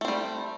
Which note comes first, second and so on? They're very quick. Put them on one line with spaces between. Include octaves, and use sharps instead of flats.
A3 C4 G3